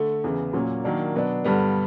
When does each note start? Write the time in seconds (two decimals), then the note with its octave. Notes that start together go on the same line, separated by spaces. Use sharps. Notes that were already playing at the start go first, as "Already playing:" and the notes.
Already playing: D3 A3
0.24 E2 C#3 E3
0.53 A#2 F#3 A#3 C#4
0.84 D#3 F#3 A#3 D4
1.15 B2 F#3 B3 D4
1.44 G2 D3 G3 B3